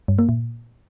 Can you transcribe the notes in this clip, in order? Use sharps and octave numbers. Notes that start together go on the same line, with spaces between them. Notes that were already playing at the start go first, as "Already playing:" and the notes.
G2
A#3
A#2